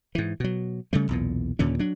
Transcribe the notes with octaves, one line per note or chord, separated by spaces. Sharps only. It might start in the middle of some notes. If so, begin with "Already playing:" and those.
G#2 E3
B2 F#3
C#3 G3 A3
B1 E2 A#2
D#2 A#2 D3 C#4
F#3 D4